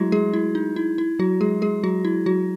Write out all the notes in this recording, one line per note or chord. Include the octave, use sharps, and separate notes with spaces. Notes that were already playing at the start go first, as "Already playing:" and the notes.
Already playing: F#3 G#3 A3 E4 F#4 G#4
G#3 G#4
E4
D#4
E4
E4
F#3 F#4
G#3 G#4
G#3 G#4
F#3 F#4
E4
F#3 F#4